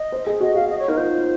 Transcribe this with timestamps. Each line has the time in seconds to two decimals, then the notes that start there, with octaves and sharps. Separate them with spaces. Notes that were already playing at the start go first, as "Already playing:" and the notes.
Already playing: D#5
0.12 C5
0.27 G#4
0.40 F#4 D#5
0.55 F#4 F5
0.68 D#5
0.79 C#5
0.88 D#4 A#4
0.97 F4 C5